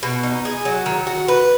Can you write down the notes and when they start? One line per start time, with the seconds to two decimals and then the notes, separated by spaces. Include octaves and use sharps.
0.03 B2
0.23 D#4
0.45 G#4
0.65 F#3
0.86 D#3
1.07 F#4
1.28 B4